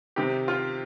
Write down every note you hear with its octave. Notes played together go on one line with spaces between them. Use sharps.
C3 D#3 G4
F4